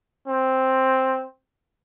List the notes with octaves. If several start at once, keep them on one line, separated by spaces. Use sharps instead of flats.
C4